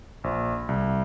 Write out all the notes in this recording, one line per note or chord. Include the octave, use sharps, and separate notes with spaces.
A#1
C2